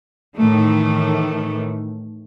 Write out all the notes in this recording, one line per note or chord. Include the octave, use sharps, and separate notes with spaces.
A2 D#3 E3 A3